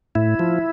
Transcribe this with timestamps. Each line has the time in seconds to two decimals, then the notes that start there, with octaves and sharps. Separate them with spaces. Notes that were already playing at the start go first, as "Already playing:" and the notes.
0.15 A2 E4
0.39 F3